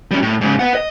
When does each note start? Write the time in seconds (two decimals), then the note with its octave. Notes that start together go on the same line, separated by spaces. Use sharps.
0.11 G3 C#4
0.22 A2
0.41 G#2 C#3
0.60 B4 F#5
0.75 D#5